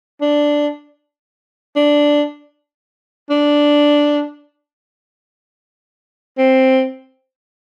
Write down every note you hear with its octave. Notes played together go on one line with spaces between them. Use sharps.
D4
D4
D4
C4